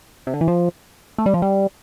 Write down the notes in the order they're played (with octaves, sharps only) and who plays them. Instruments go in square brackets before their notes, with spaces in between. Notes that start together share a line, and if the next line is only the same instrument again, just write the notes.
[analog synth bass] C3
D3
E3
F3
A3
G3
F3
G3